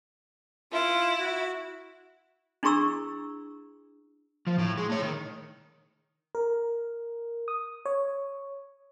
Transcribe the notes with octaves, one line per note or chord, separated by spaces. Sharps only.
E4 F4
F#4
D4 E4 G#4 A#5 C#6 E6
F3
A2
G#3
A3 C#5
D#3
A#4
D#6
C#5